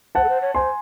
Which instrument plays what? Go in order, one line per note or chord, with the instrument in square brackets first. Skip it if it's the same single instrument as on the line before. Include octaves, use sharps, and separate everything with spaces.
[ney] C5 [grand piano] F#5 A5
[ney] A4
C5
C#5
[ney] C5 [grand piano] G#5 C6